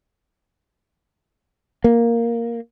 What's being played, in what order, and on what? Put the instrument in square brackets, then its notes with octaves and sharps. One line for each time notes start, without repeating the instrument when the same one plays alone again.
[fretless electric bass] A#3